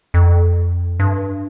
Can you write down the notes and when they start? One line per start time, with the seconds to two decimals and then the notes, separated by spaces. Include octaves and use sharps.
0.14 F2
1.00 G2